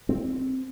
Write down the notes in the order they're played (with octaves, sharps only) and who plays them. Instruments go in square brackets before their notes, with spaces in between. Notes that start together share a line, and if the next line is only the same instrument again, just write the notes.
[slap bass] C4